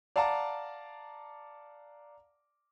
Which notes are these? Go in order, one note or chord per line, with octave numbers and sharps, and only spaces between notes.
D5 F5 F#5 A5 A#5 D6